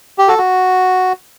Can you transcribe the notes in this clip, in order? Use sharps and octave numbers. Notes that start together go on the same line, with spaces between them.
G4
F#4 A4
F#4